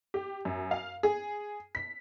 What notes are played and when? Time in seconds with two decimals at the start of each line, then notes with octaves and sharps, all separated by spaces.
0.14 G4
0.45 F#2
0.71 F5
1.03 G#4
1.75 B6